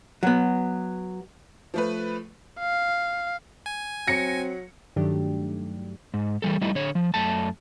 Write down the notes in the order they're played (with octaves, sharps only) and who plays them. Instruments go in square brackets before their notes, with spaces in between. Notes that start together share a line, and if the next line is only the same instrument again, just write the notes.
[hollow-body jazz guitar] F#3 B3
[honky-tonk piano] F3 A3 B4
[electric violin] F5
[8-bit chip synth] G#5
[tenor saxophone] F#3 [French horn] C4 [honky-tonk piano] A#6 C#7
[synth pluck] G2 D#3 F#3 A3 D4 G4
[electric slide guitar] G#2
E3 G3 A4
G3 A3 D#4 E4
D3 C#5
F3
F#2 A3 A5